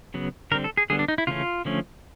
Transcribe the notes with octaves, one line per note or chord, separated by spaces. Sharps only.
C#3 F#3 B3
D3 G3 C4 A#4
A4
G#4
D3 G3 B3 G#4
D4
D#4
E4
C#3 E3 A3 C#4 F4
D3 F3 A3 C#4